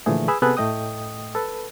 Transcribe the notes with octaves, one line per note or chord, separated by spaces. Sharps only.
A#2 D3 E3 F3 A3 G#4
G#4 B4 B5 E6
C3 B3 G#4 A4 B4 F#6
A2 A3 D#5 G5 D#6
A4 B4